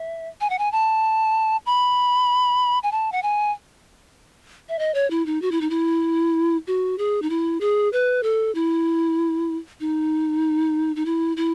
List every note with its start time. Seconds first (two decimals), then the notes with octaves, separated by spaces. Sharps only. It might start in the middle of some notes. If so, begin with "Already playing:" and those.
Already playing: E5
0.41 G#5
0.50 F#5
0.59 G#5
0.72 A5
1.66 B5
2.83 G#5
2.92 A5
3.12 F#5
3.23 G#5
4.69 E5
4.79 D#5
4.94 C#5
5.11 E4
5.26 D#4
5.42 F#4
5.51 E4
5.61 D#4
5.70 E4
6.67 F#4
6.98 G#4
7.22 D#4
7.30 E4
7.61 G#4
7.93 B4
8.23 A4
8.55 E4
9.80 D#4
10.96 D#4
11.06 E4
11.37 E4